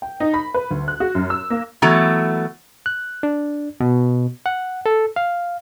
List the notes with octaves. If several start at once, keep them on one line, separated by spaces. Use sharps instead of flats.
G5
D#4
B5
B4
D2
F#6
F#4
F#2
E6
A#3
E3 F#3 A3 B3 F#4 A#5
F#6
D4
B2
F#5
A4
F5